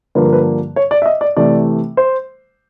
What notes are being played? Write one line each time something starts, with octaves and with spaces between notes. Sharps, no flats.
G2 D3 F3 A#3 B4
A#4
B4
C#5
D5
E5
D#5
D5
C3 E3 A3 D5
C5